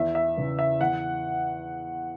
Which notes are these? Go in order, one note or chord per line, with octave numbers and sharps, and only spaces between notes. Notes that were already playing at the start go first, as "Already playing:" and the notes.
Already playing: E2 E5
E5
C#3 E3
E5
E2 F#5